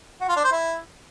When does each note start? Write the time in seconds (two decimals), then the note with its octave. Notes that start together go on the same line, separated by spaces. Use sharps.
0.21 F#4
0.29 F4
0.37 D4
0.44 C5
0.52 E4